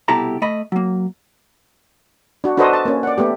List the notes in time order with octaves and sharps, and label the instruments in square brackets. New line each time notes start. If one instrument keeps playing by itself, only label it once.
[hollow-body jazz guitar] C2 B2 E4 G4 A4 A#5
A3 D#5 B5
F#3 A#3
[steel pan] D4 F#4
D4 F#4 A4 B4 C5 D#5
A5
A#3 C#4
D5 F#5
A3 B3 G4